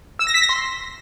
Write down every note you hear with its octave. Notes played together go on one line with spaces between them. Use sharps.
E6
A#6
B6
A#6
C6